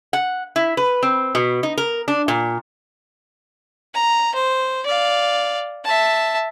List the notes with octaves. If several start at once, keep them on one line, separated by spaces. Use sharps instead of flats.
F#5
E4
B4
C4
B2
D#4
A#4
D4
A#2
A#5
C5
D5 F5
E5 A5